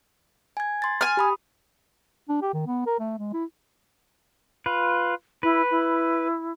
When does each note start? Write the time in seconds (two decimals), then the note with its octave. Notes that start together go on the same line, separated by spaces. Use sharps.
0.57 G#5 G#6
0.82 C6 A6
1.01 G#5 F6
1.17 G4 B5 D#6
2.29 D4
2.42 G4
2.53 D#3
2.67 B3
2.86 A#4
3.00 A3
3.19 G#3
3.33 E4
4.66 F4 B4
5.43 E4 B4
5.71 E4